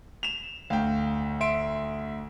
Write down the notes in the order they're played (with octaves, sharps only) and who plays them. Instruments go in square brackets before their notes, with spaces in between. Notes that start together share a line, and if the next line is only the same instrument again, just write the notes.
[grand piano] E7 F7
[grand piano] D2 [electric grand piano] F5 G5
[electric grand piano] E5 C6 D7